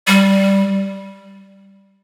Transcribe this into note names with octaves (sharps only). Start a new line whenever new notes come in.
G3